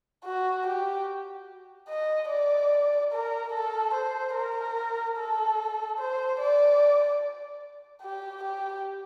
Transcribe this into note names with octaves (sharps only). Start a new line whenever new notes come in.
F#4
G4
D#5
D5
A#4
A4
C5
A#4
A4
C5
D5
G4
G4